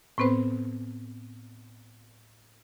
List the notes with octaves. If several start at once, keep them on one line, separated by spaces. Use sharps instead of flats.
A2 B3 C4 B4 C5